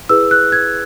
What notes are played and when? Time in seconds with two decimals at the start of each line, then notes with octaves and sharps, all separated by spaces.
0.09 E4 G#4 B4 E6
0.31 F#6
0.52 G#6